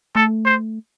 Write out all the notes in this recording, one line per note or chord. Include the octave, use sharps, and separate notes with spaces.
A3 A4
C5